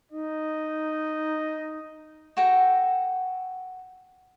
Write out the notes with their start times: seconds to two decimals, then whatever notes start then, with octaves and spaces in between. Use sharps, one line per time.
0.12 D#4 D#5
2.37 F#4 A4 G5 A#5